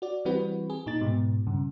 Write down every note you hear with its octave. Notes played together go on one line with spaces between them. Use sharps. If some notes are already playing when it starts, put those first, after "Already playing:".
F#4 D5
E3 G3 C4 F#4 B4
G#4
A#2 D#4 A6
G#2 B2
G2 C#3